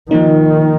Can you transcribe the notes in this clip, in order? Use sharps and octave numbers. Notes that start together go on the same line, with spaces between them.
D#3 F3 A#3 D#4